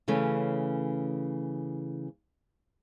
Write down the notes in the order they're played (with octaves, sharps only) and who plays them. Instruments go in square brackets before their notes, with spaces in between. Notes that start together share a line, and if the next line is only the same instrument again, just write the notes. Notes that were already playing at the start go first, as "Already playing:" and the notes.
[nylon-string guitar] C#3 E3 A3 C#4